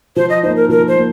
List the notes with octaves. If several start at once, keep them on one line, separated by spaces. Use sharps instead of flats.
F3 C5
D#5
A#3 D#4 C5
A#4
F3 A#4
C5
A#3